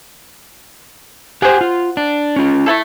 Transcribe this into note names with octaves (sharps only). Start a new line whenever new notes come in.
G4 G#4 C5 F#5 G#5
F4
D4
C#4 F4
A3 E4 A4